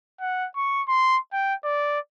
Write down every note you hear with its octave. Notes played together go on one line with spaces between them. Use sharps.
F#5
C#6
C6
G5
D5